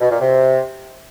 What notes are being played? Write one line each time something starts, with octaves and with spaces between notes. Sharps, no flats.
B2
A#2
C3